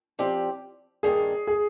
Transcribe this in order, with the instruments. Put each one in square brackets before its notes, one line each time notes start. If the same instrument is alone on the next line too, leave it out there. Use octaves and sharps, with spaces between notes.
[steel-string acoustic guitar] F3 C4 G4 D5
[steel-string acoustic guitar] G2 D#3 A#3 D4 [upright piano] G#4
[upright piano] G#4